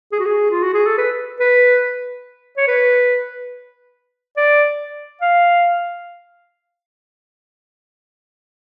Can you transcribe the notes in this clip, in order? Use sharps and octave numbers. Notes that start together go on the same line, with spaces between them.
G#4
F#4
G#4
F4
F#4
G#4
A4
B4
B4
C#5
B4
D5
F5